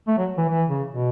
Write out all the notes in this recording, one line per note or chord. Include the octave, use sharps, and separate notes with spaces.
A3
F#3
E3
E3
C#3
B2